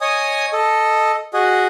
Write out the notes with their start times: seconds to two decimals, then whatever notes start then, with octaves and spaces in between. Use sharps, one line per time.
0.01 C#5 D#5 G#5 D#6
0.53 A4 D#5
1.34 F#4 G#4 D#5